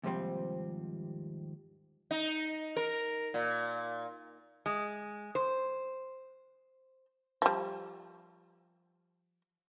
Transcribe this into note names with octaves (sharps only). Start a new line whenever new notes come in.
D#2 G#2 C3 F3 G3 C4
D#4
A#4
A#2
G#3
C5
F3 G3